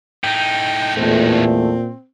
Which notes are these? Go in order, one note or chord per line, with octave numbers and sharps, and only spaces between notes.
A2 D#4 G5
E2 A#2 A3 C4